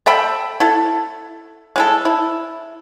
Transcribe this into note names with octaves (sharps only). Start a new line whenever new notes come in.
A4 E5 G5 B5
E4 A4
G#3 E4 A4
E4